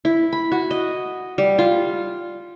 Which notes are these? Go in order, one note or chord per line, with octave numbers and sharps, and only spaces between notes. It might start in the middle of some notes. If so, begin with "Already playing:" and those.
E4
B5
F#4
D#5
G3
F4